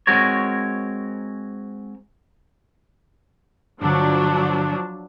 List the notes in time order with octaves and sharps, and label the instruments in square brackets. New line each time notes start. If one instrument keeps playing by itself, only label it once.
[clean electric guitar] G#3 C4 F#4 A#4 C#5
[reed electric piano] G2 D3 [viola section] F3 F#3 D4